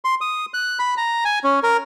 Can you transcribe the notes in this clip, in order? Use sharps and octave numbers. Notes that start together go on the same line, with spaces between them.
C6
D#6
F#6
B5
A#5
G#5
C#4
A#4